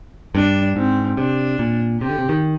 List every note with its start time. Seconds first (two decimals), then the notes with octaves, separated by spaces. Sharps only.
0.35 G2 D4
0.76 G#2 C4
1.17 C3 D4
1.59 A#2
2.01 C3 G4
2.10 D3
2.18 C3
2.29 D#3